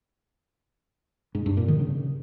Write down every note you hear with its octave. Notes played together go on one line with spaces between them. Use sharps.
G#2
G2
A#2
D#3
C#3